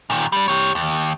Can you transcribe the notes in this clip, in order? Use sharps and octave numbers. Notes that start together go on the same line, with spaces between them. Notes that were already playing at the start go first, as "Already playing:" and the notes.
A#2 D#3
G3 D4
G4 C#5
D#2